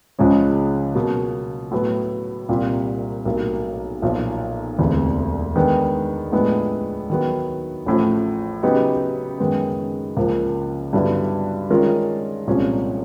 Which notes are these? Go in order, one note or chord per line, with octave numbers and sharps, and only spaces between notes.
C#2 C#3 F3 G#3 C#4
B2 F#3 A#3
A2 F#3 B3
C2 A#2 G3
B1 A2 F#3 A#3
B1 A#2 F3
E1 D2 C3 E3
D#3 G#3 B3 D4
A2 F3 G#3 B3 D4
D#3 F#3 B3
A1 A2 F3
C#3 F#3 B3 D#4 G4
F#2 D#3 G#3 B3
C#2 C#3 F3 A#3
G2 D3 F#3 B3 E4
D#3 G#3 C#4 F4 A#4
C2 A#2 F3 G#3 C#4